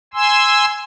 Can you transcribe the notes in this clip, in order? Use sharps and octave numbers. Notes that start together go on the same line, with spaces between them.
G#5 C6 E6